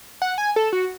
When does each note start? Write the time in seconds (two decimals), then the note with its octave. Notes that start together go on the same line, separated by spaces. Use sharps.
0.22 F#5
0.38 G#5
0.56 A4
0.73 F#4